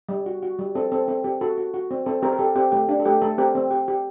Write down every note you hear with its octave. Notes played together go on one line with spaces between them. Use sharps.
G3
F#4
F#4
G3
C4 A4
C4 A4
C4 A4
C4 G4
F#4 A4
F#4
F#4
C4
C4 A4 C5
C4 G4 A#4
A#4
G4 A4
C4 G4
A3 G4
D4 G4
A4
A3 G4
A3 A4
C4 G4 A#4
C4
G4
G4